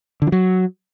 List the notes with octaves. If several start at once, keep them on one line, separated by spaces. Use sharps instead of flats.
D3
F3
F#3